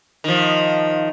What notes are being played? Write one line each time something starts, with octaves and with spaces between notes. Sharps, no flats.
D#3 F3